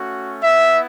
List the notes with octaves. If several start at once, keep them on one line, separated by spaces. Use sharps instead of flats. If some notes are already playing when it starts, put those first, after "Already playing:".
Already playing: A3 C#4 F#4
B3 E4 E5